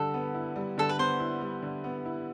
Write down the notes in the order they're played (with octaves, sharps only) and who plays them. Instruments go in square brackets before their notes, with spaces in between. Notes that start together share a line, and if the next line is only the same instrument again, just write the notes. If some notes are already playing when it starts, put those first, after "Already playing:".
Already playing: [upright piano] D3 G3 [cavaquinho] A4
[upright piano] B3
E4
G3
[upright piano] D3 [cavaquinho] A4
[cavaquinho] B4
[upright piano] B3 [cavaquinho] C5
[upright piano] E4
G3
D3
B3
E4